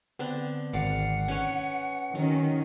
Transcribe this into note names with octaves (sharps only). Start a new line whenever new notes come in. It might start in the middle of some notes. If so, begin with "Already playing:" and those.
D3 B3 C4 D4
G#1 D5 F5 F#5
C#4 B4 C#5 G#5
D#3 F#3 C#4